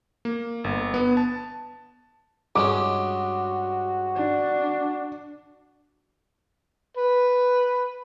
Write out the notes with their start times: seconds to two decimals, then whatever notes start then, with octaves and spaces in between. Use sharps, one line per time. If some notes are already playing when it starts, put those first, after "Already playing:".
0.25 A#3
0.64 G1
0.94 B3
1.17 A5
2.56 G2 G#3 C#4 F#4 D6
4.16 D4
6.97 B4